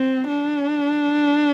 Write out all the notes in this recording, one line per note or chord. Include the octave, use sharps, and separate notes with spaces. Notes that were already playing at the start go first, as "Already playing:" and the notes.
Already playing: C4
D4